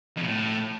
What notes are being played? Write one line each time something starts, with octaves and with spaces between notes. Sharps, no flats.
F2
B2
A2